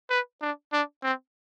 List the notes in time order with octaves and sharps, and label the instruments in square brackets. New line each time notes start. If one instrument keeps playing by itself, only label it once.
[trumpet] B4
D4
D4
C4